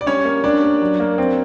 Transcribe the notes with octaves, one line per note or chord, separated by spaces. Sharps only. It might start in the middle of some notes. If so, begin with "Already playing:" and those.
D5
G3 C#4 C#5
A#3
G3 D4 D5
A#3
F#3
A#3
C4